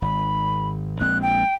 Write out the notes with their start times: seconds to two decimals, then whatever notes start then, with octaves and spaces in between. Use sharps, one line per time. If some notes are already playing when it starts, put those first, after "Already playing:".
0.02 G#1 B5
1.00 A#1 G#3 C4 F#6
1.22 G5